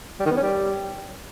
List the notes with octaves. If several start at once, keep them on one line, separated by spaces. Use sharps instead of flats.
G3
D#3
B3
C#4
G3